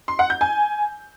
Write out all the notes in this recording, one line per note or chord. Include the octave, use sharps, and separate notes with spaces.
C6
F#5
G6
G#5